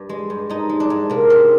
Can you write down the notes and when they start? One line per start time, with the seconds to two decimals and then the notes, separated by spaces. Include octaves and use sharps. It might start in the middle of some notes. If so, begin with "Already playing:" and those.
Already playing: G2
0.09 G#3
0.30 G2
0.50 G#2 D#4
0.69 G#3
0.80 D4
0.90 G#2
1.10 C3 A#3
1.30 G#3 C4